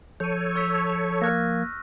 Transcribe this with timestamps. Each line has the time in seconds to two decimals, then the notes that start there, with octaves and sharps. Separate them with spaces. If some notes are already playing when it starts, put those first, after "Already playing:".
0.20 F3 A4 C#5 G6 D#7
0.56 C#6 E6 B6
1.22 A#3 F6 F#6 G#6 A#6